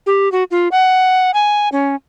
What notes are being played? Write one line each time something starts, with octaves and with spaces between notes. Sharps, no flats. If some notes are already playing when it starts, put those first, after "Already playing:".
G4
F#4
F4
F#5
G#5
C#4